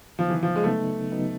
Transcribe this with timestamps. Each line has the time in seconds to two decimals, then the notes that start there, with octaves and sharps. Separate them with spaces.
0.19 C#3 F3 F#3 B3 D#4
0.30 E3
0.43 F3
0.56 G#3
0.64 C#3 F#3 A3 B3 D#4
1.11 C#3 F#3 B3 D#4